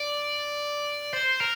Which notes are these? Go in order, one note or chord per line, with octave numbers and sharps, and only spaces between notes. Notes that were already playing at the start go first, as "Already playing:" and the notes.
Already playing: D5
C5
A#4